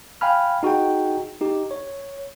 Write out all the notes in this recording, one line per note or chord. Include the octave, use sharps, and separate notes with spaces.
F5 G5 G#5 B5 F6
D#4 F#4 G#4 G5
D#4 G4
C#5